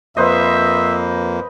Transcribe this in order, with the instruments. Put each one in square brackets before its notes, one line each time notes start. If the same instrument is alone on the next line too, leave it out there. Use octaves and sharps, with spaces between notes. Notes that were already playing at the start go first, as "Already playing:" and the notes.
[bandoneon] F2 A#3 [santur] B4 C5 D#5 [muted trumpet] E5